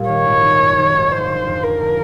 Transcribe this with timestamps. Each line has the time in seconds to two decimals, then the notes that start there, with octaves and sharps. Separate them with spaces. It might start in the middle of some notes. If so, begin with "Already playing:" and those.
Already playing: A#2 G3
0.08 D#3 C#5
0.25 G#1
0.43 D#3
0.60 F#2
0.77 D#3
0.94 G#1
1.12 F1 C5
1.29 D3
1.47 F2
1.63 F2 A#4
1.81 D3